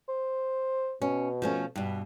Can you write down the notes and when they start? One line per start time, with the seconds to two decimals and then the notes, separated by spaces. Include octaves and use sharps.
0.08 C5
1.02 B2 C#4
1.42 F3 A3 C#4
1.76 G2 B2